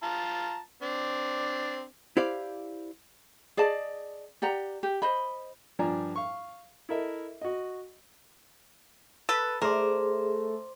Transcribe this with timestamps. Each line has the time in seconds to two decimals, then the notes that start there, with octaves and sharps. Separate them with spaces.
0.03 F4 A5 A#5
0.82 C4 D4
2.17 E4 G4 C5 D5 F5
3.57 G#4 D5 D#5 A5
4.42 G4 D5 F#5 A#5
4.83 G4
5.02 C5 D#5 B5
5.79 G2 F3 D4 G#5 A#5
6.16 F5 C#6
6.89 E4 A4 A#4 D#5 E5
7.41 F#4 D#5
9.29 A4 B4
9.62 A3 G#4 A#4 C5 D5 E5